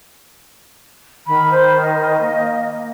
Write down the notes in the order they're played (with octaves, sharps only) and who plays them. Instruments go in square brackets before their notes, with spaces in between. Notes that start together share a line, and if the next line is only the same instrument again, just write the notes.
[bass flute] D#3 [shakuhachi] B5
[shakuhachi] C5
D#5
[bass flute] A#3